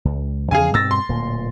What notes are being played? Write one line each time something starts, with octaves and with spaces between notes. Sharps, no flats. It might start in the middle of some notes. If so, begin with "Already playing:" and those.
C#2
E2 C#3 F3 G#4 F5 G#5
G2 B2 C4 E6 A6 A#6
C6
D1 A#2